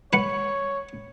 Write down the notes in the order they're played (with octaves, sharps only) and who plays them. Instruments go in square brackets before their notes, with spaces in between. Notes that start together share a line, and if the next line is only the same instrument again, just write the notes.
[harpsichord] B4 F#5 [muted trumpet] C#5